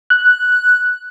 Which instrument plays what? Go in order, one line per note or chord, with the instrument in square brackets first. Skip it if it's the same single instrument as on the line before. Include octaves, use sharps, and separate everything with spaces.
[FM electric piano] F#6